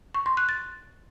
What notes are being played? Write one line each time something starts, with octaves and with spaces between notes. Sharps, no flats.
C#6
C6
F#6
A6